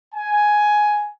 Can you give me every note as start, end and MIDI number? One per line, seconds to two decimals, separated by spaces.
0.15 1.10 80